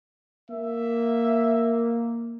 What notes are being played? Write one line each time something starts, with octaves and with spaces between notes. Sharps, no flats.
A#3 E5